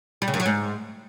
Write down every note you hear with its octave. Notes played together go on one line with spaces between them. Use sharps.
G3
C#3
F#2
F#3
G#2